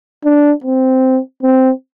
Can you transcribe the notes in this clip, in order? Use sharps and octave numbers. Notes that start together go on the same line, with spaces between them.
D4
C4
C4